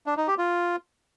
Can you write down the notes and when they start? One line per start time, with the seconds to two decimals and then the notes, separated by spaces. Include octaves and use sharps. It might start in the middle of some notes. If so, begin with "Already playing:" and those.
0.06 D4
0.17 D#4
0.28 G4
0.38 F4